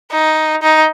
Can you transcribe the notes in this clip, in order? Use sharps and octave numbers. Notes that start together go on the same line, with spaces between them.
D#4
D#4